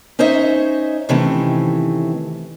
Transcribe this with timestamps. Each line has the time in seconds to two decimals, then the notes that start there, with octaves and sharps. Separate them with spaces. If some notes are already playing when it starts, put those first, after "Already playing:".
0.19 C#4 D#4 C5 C#5 D#5 E5
1.09 C3 D#3 E3 A3 C4 C#4